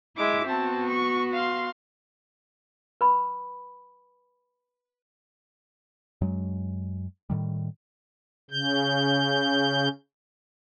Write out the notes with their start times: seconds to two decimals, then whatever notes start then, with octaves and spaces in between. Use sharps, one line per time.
0.17 G#3 E4 E5 D6
0.47 B3 C4 F#4 A5
0.88 C#6
1.33 F5 C6
3.01 B4 B5 D6
6.21 F#2 F#3 G#3
7.30 A2 D#3 G3
8.51 C#3 G6